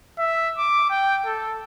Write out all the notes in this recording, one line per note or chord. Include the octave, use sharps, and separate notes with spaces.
E5
D6
G5
A4